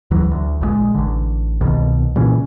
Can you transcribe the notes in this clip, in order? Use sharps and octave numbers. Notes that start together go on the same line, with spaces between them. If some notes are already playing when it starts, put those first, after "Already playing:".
D2 E3 F#3
D2
A#1 C#3 G#3
A1 D3
C2 B2 D#3
A#2 C#3 E3 C#4